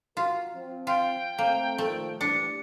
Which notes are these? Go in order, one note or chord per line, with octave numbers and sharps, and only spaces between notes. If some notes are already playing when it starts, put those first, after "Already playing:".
F4 F#4 A#4
F3 C4
F4 G5
A3 A#3 C4
A#2 D#3 F3 A3
E3 G3 D4 C#7